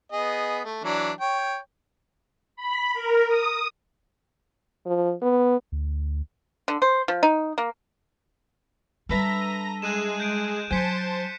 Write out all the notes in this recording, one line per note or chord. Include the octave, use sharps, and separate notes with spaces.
B3 G#4 D#5
A3
E3 F#3 D4
C#5 G5
B5
A#4
D#6
F3
B3
D2
D3
C5
F3
D#4
A#3
G3 D4 A4 B4 E5 A#5 A#6
D#7
G#3 G#4 F#6 D#7 E7
G6 D7
F#3 C5 G#5 A5 G6 B6 C#7